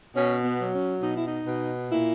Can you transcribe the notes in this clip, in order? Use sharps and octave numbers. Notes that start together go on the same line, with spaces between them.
B2 C#4
B3
F#3
C#4
B2 D#4
E4
D#4
B2
A#2 E4